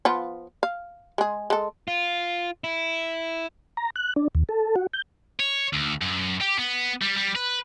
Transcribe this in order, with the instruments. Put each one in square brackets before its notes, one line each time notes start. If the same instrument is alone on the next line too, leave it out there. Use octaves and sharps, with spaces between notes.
[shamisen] F3 B3 F4
F5
G#3 G#4
G#3 A4
[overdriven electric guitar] F4
E4
[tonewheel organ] A#5
F#6
D4
D#2
A4
F#4
G6
[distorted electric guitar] C#5
D2
F#2
G4
B3
G3
G3
B4